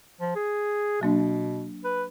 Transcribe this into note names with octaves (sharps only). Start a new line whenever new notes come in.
F3
G#4
B2 F#3 A#3 D4
B4